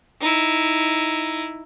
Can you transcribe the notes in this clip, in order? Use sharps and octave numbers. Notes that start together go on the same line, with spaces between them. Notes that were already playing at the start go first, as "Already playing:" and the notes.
D#4 E4